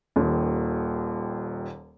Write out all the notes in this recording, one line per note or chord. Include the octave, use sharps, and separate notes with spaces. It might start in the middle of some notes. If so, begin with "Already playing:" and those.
D#1 D#2